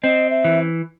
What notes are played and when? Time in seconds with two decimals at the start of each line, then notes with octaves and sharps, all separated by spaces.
0.03 C4 D#5
0.30 E5
0.45 E3